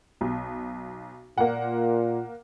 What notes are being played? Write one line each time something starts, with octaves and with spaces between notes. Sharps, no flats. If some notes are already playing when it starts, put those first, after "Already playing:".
B1
A#2 A#3 F#5